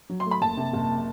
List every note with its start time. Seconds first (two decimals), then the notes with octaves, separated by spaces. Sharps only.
0.10 F#3
0.20 C6
0.26 A3
0.31 B5
0.41 F#1 A5
0.57 C3
0.73 F#1